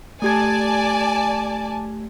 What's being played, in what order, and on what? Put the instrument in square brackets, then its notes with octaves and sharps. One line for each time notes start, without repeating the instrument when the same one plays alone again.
[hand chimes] A3 G4 G#6 [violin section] D5 G#5 A5